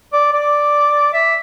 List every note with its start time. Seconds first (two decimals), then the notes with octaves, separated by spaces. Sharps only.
0.13 D5
0.33 D5
1.14 E5